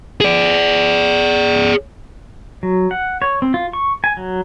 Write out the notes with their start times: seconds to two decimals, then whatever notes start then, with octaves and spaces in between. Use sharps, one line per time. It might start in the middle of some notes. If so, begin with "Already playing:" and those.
0.21 G#4 D5
2.63 F#3
2.91 F#5
3.22 C#5
3.42 C4
3.54 F4
3.73 C#6
4.04 G#5
4.17 F#3